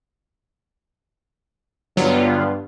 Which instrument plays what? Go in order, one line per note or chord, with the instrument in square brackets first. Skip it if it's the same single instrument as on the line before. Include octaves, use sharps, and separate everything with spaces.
[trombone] G2 [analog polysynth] D3 B3 F4 [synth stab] F#3